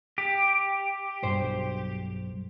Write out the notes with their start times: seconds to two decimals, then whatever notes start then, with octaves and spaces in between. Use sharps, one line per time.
0.18 G4
1.23 B1 G2 C5